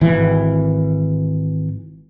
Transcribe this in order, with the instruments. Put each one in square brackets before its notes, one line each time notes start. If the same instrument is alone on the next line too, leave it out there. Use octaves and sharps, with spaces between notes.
[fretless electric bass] G#1 E3